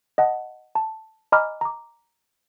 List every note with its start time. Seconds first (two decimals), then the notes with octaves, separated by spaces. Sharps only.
0.18 D#5 F#5 A5
0.75 A5
1.32 D#5 G#5 A#5 B5 D6 F6
1.61 A#5 D6